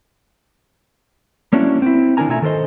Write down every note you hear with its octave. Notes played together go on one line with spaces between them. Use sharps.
A#3 C#4 D4 E4 F#4
C4 E4
D#3 D4 E4 A#4 G#5 A#5
B2 A3 F4 E5 G#5 A#5
D#3 A4 A#4 C5 D#5